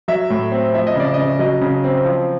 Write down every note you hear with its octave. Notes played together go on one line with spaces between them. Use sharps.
F#3 E5
A2
C4
F3 E5
D#5
C#3 D5
D#5
C#3
F#3 D#5
C#3
C4
F3